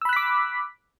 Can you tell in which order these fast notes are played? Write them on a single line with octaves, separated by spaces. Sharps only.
E6 B5 F#6 B6 D6